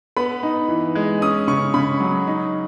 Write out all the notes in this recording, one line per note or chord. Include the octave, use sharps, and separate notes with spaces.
B3 B5
D#4
E3
G#3
C#4 D#6
C#3 C#6
C#3 B5
F#3
D#4